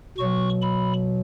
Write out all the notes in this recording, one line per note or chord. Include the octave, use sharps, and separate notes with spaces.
B2 F#3 C#6
B5